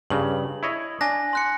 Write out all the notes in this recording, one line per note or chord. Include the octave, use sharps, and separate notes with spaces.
G2 C#3 F#7
E4 C#5 D#5
D4 G#5 A#6
C6 F#6 C#7